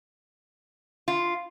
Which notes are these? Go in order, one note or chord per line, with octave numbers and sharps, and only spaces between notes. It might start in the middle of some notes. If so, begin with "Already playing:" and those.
F4